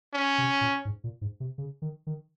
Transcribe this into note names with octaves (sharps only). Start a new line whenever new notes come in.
C#4
C3
A#2
G#2
A#2
G#2
C3
C#3
D#3
D#3